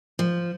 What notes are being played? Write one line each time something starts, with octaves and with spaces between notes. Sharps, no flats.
F3